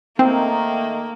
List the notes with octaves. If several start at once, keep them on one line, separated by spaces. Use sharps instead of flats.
D#3 A3 A#3 C4